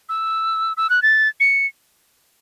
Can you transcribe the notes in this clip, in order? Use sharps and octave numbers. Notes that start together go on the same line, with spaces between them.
E6
E6
F#6
A6
C#7